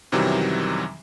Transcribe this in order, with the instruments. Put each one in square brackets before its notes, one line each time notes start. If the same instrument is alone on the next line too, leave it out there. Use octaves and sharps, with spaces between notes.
[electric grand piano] F#2 C3 D#3 E3 F#3 G3